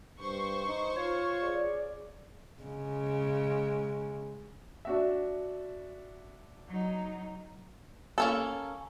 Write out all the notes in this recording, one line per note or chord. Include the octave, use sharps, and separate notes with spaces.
G2 C5 C#6
D#4
F4 C#5
G#4 D5
C#3 G#3
D4 F#4 E5
F#3 D#4
A#3 C#4 A4